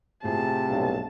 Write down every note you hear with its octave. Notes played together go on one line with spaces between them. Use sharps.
A2 C3 F4 G#4 A5
B1 G2